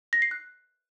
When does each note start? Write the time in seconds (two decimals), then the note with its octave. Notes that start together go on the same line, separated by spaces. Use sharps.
0.13 A#6
0.22 C7
0.31 F#6